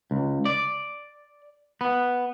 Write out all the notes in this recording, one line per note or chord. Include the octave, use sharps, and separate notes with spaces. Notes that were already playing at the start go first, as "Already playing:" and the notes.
C#2
D5
B3